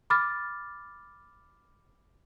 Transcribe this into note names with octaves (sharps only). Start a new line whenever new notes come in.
B5 D6 F6 A6